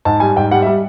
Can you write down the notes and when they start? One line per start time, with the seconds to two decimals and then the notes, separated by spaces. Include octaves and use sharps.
0.05 G#2 A5
0.20 G3 G#5
0.36 G#2 G5
0.51 G3 F#5
0.62 E5
0.66 G3